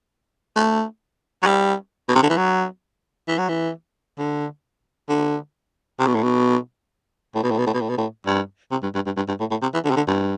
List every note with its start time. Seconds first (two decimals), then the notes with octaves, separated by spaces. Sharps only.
0.56 A3
1.43 F#3
1.46 G3
2.08 B2
2.15 C3
2.22 D3
2.29 E3
2.37 F#3
3.28 E3
3.38 F#3
3.49 E3
4.19 D3
5.09 D3
5.99 C3
6.07 B2
6.15 A2
6.23 B2
7.35 A2
7.43 B2
7.51 A2
7.59 B2
7.66 A2
7.74 B2
7.81 A2
7.89 B2
7.97 A2
8.26 G2
8.71 C3
8.83 G2
8.95 G2
9.06 G2
9.17 G2
9.28 G2
9.40 A2
9.51 A2
9.62 C3
9.74 E3
9.85 D3
9.91 C3
9.96 D3
10.07 G2